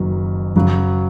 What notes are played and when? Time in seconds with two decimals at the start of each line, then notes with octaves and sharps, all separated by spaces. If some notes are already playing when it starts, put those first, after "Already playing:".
Already playing: F#1 F#2 D#3 F#3
0.56 F#2 C#3 F#3 C#4 F#4